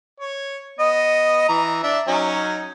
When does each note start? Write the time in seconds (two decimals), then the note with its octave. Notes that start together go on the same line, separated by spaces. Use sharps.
0.20 C#5
0.80 B3 D#5
1.49 E3 A#5
1.83 D4 E5
2.08 F#3 C#4 D#4